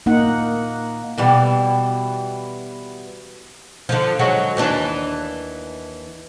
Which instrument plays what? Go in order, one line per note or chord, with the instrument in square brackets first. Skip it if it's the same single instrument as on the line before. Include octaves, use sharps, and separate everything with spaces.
[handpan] A#3 D#4 F#5
[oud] B2 E3 G3
D3 F3
F#3 G#3 F#4
D#2 E3 D4